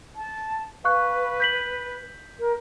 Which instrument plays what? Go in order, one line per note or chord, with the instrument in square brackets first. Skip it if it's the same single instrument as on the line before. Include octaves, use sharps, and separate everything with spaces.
[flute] A5
[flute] B4 [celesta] F5 C#6 F#6
[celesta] G6 B6 F#7
[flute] A#4